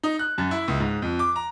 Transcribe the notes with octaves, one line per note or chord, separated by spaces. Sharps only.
D#4
F#6
F#2
E4
C#2
G#2
F2
D6
A#5